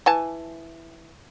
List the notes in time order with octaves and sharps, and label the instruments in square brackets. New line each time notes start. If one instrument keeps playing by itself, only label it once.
[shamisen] E3 G#5 A5